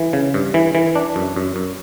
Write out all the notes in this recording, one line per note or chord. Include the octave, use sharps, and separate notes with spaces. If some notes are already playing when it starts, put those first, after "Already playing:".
Already playing: E3
C#3
G2
E3
E3
D4
F#2
F#2
F#2